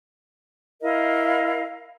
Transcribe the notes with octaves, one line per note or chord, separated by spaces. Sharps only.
E4 A#4 D#5 F5